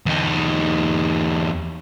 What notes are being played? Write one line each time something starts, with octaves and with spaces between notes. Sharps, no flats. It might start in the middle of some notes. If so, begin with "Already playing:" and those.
E2 D#4